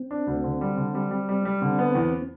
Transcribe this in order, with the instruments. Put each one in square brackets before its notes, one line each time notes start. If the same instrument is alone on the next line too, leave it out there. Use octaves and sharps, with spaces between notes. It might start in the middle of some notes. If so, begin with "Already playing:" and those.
Already playing: [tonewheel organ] C4
[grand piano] D4
D2
D3
G3
D3
G3
G3
G3
G3
[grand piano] D3 [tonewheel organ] C4
[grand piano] B3
E2